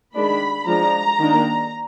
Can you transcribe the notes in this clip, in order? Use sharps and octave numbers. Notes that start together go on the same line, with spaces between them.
D#3 G#3 D4 B5
F3 G#3 D4 A#5
D#3 A#3 D4